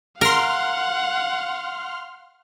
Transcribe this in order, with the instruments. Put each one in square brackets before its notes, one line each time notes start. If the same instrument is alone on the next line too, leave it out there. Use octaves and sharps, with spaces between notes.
[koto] A#4 [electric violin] F5 F#5 [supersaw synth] C6 F6